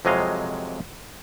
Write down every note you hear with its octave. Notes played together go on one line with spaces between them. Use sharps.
F2 C3 F#3 G#3 D#5 F5